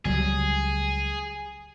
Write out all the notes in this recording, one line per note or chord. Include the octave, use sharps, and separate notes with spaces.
C#2 F#3 G3 G#4